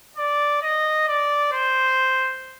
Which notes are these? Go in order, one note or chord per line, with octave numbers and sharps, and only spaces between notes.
D5
D#5
D5
C5